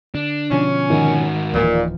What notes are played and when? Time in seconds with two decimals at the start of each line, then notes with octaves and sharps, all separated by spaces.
0.15 D3 D4
0.51 B2 D3 F3 C#4
0.90 G#2 D#3 F#4
1.54 D1 A#2 E3 F3